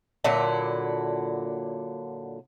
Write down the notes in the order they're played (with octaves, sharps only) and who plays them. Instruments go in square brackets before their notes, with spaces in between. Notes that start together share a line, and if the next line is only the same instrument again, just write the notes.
[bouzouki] A#2 D3 F#3 E4